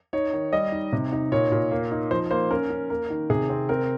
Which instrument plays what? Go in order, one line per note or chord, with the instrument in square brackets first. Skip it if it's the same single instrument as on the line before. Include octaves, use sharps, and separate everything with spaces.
[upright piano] D#4 C#5
D#3
G3 D#5
D#4
C3
D#4
A#2 C#5
A#2
A#3
D#4
F3 C5
A#3 C5
C#4 A#4
C#4
A#3 A#4
D#3
C3 G#4
C4
C4 A#4